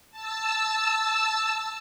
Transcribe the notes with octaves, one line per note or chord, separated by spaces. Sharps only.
A5 E6